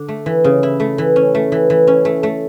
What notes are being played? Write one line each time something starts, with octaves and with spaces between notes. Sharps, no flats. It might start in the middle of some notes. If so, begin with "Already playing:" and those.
Already playing: D3 D4
A3
E3
C#3
E4
A3
E3
C#4
A3
E3
E3
C#4
A3
A3